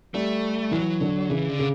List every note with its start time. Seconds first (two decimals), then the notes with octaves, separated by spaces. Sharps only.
0.14 G3 A3
0.71 E3 F#3
1.01 D3
1.29 C#3 E3
1.49 D3
1.59 C#3